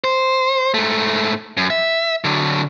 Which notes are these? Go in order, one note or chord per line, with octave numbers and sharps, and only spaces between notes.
C5
G#2 A3
F#2
E5
D3 F#3